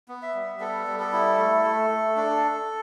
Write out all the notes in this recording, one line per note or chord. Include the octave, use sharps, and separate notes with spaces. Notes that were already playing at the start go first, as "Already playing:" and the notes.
B3
E5
G3
B3 A4
G3
A4
E4
A3
A3
A3
D4